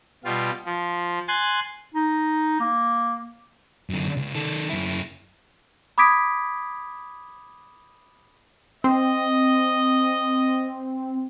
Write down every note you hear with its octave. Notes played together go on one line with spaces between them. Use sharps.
B2 G3 F4
F3
G#5 C6 F#6 A6
D#4
A#3
F#2 D3
C#2
D#3 A4
F#2 E4
B5 D6 D#6 G#6 B6 D7
C4 D#5